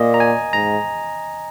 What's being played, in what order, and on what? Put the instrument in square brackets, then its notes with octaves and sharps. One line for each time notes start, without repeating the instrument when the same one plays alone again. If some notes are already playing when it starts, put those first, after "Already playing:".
Already playing: [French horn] A#2 [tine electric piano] D#5
[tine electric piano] A#5
G#5
[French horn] G#2 [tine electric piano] A#5